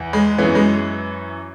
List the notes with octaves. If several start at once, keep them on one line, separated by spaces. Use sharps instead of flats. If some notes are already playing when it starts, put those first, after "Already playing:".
Already playing: E2 E3
G#3
F#2 E3 B3
G#3